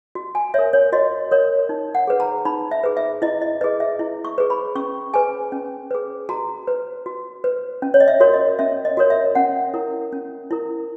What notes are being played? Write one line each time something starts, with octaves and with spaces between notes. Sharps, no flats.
F#4
G#5
A#4 C#5 E5
C#5
F#4 D#5
A#4 C#5
D#4
F#5
G#4 B4
A#5
D#4 B5
E5
G#4 B4
E5
E4 D#5
D#5
G#4 B4 D#5
E5
E4
C#6
G#4 B4
B5
C#4 C#6
G#4 B4 G#5
C#4
G#4 B4
F#4 A#5
B4
F#4
B4
C#4
C#5
D#5
E5
F#4 A#4 C#5
D#5
C#4 E5
D#5
F#4 A#4 C#5
E5
C#4 F#5
E4 A#4
C#4
E4 A#4